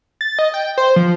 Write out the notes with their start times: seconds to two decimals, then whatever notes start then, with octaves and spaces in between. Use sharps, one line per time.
0.21 A6
0.39 D#5
0.54 G5
0.78 C5
0.96 F3